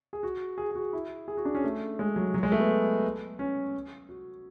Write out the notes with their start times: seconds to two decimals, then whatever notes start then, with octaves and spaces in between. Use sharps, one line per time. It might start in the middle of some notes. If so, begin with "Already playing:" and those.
0.13 G#4
0.23 F#4
0.58 G#4
0.71 G#4
0.75 F#4
0.93 E4
1.28 G#4
1.37 F#4
1.45 D4
1.55 C#4
1.64 A3
1.99 G#3
2.16 F#3
2.34 F#3
2.43 G#3
2.52 A3
2.59 B3
3.39 C#4
4.09 F#4